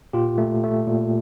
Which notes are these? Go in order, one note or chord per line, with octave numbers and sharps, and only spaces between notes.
A#2 F4 G4
A3
A3
A#2